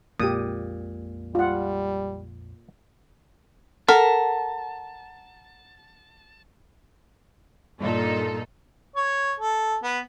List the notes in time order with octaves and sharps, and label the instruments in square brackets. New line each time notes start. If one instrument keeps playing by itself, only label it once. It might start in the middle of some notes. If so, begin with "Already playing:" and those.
[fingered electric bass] A#1 F2 G#3 [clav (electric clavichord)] A#2 [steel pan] G4 D#6
[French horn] G3 [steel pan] F4 F#5
[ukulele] A4 [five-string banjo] A#4 [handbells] F#5 [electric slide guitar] A5
[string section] G2 A#2 D#4 A4
[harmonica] C#5
A4
B3